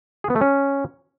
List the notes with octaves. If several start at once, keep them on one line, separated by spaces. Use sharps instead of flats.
G#4
B3
A3
C#4